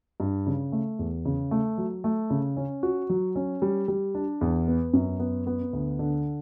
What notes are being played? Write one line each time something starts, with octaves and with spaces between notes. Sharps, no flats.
G2
C#3
A3
E2
C#3
A3
F#3
A3
C#3
C#4
F#4
F#3
C#4
G3
G3
D4
E2
B3
F#2
B3
B3
D2
D3